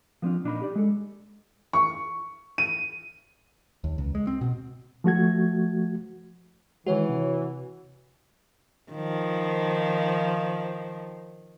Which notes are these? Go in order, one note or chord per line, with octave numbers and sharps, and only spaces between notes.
F3 B3 C4 D4 F4
A#2 D4 D#4 B5
G4 D5
G#3 A4
C#6
D#7
D#2
C#2
G#3
C4
B2
F3 A3 F#4 G#6
D#3 E3 G#3 F#4 C#5
C3
D#3 F3